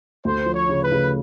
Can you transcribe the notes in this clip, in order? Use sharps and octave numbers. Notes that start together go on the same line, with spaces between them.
D2 C5
F3
C#5
C#3
B4
C#3